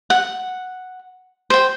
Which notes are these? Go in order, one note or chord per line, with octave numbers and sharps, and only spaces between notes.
F#5
C5 G5